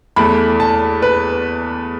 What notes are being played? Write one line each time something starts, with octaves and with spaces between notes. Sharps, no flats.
E2 E3 A3 B5
A5
B4